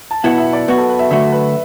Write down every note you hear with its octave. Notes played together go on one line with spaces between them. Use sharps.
A5
B1 B2 B3 E4 F#5
E5
D5
B1 B2 B3 F#4 B4
A4
B4
E5
D2 D3 F#3 A3 F#4 E5
B4